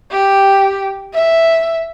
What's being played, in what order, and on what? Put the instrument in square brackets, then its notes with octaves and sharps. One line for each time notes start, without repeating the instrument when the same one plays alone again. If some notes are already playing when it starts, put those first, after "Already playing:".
[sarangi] G4
E5